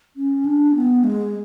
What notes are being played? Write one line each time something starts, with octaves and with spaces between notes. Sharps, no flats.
C#4
D4
B3
G#3